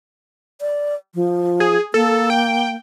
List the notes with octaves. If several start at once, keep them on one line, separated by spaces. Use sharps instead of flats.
D5
F3
G#4
A#3 A4
G5